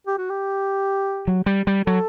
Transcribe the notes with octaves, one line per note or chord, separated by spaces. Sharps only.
G4
F#4
G4
F#3
G3
G3
F#3 A4